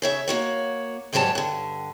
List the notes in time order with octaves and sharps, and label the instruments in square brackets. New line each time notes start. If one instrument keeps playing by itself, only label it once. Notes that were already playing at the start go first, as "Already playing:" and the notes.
[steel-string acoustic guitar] C#3 C#5 E5
A#3 F#4 C#5
D#2 G#2 F#3 G3 C#5 A5
G2 D3